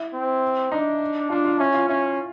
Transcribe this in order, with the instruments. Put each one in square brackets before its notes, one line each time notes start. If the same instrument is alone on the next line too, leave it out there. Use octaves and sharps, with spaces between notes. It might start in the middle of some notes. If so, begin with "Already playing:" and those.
Already playing: [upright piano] E4
[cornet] C4
[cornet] D4 [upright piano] D#4
[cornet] D4 [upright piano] F4
[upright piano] F4
[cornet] C#4 [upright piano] E4
[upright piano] F4
[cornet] C#4 [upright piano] E4